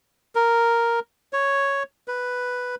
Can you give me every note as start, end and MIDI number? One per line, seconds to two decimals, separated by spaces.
0.35 1.00 70
1.33 1.83 73
2.08 2.75 71